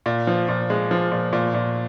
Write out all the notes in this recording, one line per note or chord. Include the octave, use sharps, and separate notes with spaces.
A#2
F3
A#2
G#3
F3
A#2
A#2
A#2